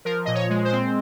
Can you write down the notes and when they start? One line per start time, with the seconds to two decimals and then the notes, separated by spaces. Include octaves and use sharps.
0.05 F3 A#4
0.25 A#2 D#5
0.35 C#5
0.50 G#3
0.64 C5
0.72 C4